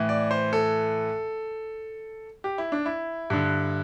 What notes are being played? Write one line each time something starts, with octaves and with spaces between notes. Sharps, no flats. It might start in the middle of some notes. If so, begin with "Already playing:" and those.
Already playing: A2 E3
D5
C5
A4
G4
E4
D4
E4
G2 D3